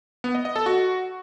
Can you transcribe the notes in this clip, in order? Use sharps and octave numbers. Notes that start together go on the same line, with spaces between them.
B3
D#5
D#5
A4
F#4